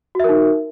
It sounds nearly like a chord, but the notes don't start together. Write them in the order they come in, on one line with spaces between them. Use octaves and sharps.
F#4 E5 A#4 D#4